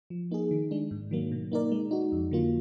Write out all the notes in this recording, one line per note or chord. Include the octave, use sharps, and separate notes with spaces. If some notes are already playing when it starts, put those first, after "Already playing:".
F3
A#3 D#4 G#4
D#3
G#3 D4
G#2
D#3 F#3 A#3
B2
A#3 D#4 A#4 D5
G#3
D#4 F#4
F2
D3 F#3 A#3 F4